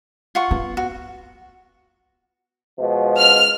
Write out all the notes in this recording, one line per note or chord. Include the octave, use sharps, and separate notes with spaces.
F4 F#5 C#6
B3
F#4
B2 F3 G#3
F6